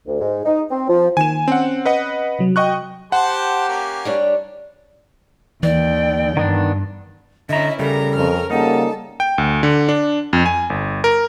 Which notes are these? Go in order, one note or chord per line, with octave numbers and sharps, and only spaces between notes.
D2
G#2
D#4
C4
F3
D#3 A#3 G#5 E7
C4 C#4 F#5
B4 D#5 F#5
C3 F#3
F#4 D#5 G5 C#6 F#6
G4 C5 F#5 A5 C6
A#3 C#4
G3 D4 C#5
D#2 E3 D5 G5
G2 D#3 B3 D4
D3 C#4 E4 D#5 E5 A#5
C#3 G3 A4 A#4 A#5
F2 C#4 A#4 F6
C#3 G3 A#3 D#4 A4 F#5 A5
G5
D2
D3
D4
F2
G#5
G1
A#4